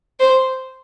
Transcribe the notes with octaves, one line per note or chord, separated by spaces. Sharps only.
C5